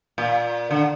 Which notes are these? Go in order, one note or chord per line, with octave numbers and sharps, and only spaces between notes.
A#2
D3